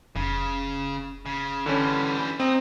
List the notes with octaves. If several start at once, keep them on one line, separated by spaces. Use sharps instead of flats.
F1 C#3
C#3
D3 E3 G3 C#4
C4 D#4 D#5